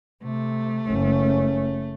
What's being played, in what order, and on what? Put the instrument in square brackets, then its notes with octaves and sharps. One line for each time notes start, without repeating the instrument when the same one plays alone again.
[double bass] C3 [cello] A3
[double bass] F#1 C#4